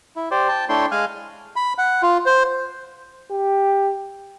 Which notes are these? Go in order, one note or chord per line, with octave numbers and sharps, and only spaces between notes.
E4
G4 C5 D5
G5 A5
A3 D4 E4 C#5 G5 C6
G#3 F5 G#5 F6 F#6
B5
F#5
F4
C5
G4